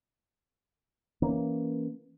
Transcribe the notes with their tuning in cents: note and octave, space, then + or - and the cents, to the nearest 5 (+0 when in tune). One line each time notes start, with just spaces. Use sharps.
E3 +0 A#3 +0 C#4 +0